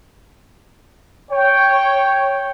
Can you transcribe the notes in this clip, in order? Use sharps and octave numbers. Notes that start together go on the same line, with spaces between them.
C#5 G5